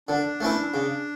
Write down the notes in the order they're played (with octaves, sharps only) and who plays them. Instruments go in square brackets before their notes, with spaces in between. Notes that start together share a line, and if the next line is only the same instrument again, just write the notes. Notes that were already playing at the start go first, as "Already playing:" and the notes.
[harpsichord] D3 [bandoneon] D4
[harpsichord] A3 C#4 E4 B4
C#3